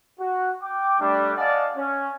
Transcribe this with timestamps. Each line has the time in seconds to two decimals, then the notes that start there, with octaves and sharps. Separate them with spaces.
0.20 F#4
0.63 G5 D6
1.00 G3 A3 D4
1.37 D5 D#5 F5 F#5 G#5 A5
1.77 C#4